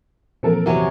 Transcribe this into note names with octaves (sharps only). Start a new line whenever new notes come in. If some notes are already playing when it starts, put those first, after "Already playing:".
A#2 E3 F3 C4 A4 A#4
E2 C3 F#3 C#5